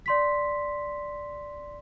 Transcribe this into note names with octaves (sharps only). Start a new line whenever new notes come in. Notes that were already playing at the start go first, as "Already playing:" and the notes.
D5 C6 B6